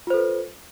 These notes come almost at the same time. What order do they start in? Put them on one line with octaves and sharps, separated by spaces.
F4 C5 A4 B4